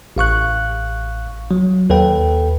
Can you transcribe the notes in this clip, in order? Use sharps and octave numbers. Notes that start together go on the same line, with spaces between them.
A1 F5 C#6 F#6
F#3
D#2 A4 B4 G5